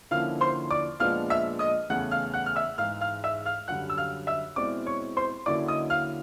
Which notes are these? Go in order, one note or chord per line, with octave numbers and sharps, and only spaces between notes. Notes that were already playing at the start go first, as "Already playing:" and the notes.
D3 F3 A#3 C#4 E4 F5 F6
C5 C6
D5 D6
A#2 F3 G#3 B3 D4 F5 F6
E5 E6
D#5 D#6
E2 C#3 E3 A3 F#5 F#6
F5 F6
F#5 F#6
F6
E5 E6
G#2 E3 G#3 F5 F6
F5 F6
E5 E6
F5 F6
F#2 D3 G3 F#5 F#6
E6
F5 F6
E5 E6
B2 G#3 C4 E4 D5 D6
C#5 C#6
C5 C6
D3 F#3 A#3 C#4 E4 D5 D6
D#5 D#6
F5 F6